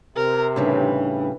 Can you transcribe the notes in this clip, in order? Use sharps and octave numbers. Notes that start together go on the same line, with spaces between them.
C3 A#4
A2 C#3 E3 G3 D4 D#4 B4